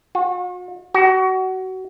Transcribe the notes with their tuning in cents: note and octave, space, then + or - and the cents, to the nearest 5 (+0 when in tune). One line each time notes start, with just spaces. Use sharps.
F#4 -45
F#4 +25